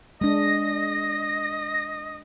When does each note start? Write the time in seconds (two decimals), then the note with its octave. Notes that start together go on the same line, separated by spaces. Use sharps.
0.21 G#3 D4 D#5 A#6